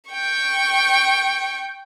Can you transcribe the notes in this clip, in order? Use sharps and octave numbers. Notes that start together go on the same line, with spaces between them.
G5 C#6